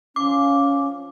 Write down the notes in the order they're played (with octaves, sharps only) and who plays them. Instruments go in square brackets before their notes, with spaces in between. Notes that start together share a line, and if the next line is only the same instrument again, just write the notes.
[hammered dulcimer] F3 F5 [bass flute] C#4 [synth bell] D6